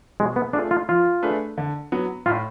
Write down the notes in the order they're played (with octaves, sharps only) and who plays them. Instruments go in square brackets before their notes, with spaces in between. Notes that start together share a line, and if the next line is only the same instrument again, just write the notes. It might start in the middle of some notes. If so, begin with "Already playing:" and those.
[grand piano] B2 [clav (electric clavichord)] G#3
[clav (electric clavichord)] B3
[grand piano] A3 F4 G#4 [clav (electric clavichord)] D4
[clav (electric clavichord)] F4
[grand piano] F3 [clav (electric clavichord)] F4
[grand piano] A3 D4 G#4 B4
D3
F#3 B3
[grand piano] A2 [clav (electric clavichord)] F4